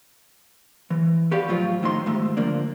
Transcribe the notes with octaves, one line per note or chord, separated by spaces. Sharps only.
E3
F#4 G4 B4 D5 F5
A2 F3 F#3 F4
F2 A2 D#3 F3 D#4 C6
D#2 G#2 A3
D3 F3 A#3 D4